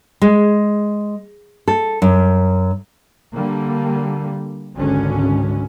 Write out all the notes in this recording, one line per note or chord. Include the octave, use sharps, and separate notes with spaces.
G#3
A4
F#2
D3 G3 A#3
G#1 C#2 D3 F#3 C#4